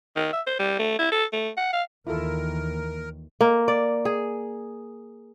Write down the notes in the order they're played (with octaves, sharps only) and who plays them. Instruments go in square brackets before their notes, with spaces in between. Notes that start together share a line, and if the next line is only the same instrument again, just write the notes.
[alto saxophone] D#3
E5
C5
G3
A3
E4
A4
A3
F#5
F5
[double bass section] D#2 [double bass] D#3 E3 [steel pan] E4 F4 A4 [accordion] A#4
[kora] A#3
D5
G#4